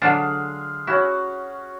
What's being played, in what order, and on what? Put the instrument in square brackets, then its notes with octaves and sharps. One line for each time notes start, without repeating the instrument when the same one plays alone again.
[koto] D3 F#3 D4 [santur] G#3 G#4 F5
[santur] C#4 F#4 [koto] E4